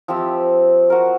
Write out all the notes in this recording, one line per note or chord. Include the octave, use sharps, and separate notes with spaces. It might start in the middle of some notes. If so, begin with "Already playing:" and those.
F3 C4 G4 E5
F#4 A#4